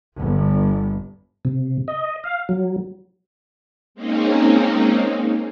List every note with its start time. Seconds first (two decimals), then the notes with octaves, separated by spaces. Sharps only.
0.18 G1
1.45 C3
1.88 D#5
2.24 F5
2.49 F#3
3.95 G#3 A#3 C4 C#4 D#4